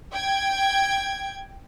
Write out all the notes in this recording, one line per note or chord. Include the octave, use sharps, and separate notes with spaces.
G5 G#6